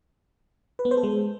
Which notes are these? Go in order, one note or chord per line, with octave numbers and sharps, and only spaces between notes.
B4
B3
C5
A4
G#3